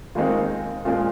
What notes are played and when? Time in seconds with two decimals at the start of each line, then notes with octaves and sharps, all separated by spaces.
0.15 D#2 D#3 G#3 C4 D#4 F4
0.85 A#2 F3 G#3 F4